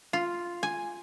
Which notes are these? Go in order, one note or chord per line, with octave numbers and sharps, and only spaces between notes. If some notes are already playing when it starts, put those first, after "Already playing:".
F4
G#5